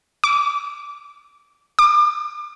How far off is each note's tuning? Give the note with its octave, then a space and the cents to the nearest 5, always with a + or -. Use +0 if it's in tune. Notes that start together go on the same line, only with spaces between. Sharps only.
D6 -20
D6 +35